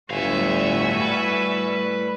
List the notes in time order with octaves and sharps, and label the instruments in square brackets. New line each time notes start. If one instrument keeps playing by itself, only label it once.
[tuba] G1 [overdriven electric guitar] A2 F5 [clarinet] G3 [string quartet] F#4 E5 G#5
[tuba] A2 [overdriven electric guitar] B4